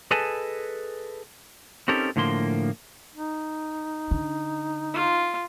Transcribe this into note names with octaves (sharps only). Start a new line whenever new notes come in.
G#4 A4 B4 D#5 G#5 A5
C4 C#4 D#4 G4 A4 A#4
A2 D3 F3 A#3 C6
D#4
D3
F4